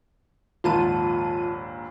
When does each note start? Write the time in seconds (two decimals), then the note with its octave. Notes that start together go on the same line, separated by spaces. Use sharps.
0.64 A#1 D#2 G#2 F4 A5 D#7